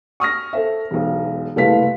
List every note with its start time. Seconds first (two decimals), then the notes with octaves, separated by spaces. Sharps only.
0.20 C#6 D#6 F6 A#6
0.53 A4 C5 E5
0.91 E1 B1
1.56 F#1 C2 A3 B4 F5 B6